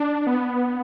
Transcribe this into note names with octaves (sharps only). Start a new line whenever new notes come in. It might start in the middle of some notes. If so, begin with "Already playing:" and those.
Already playing: D4
B3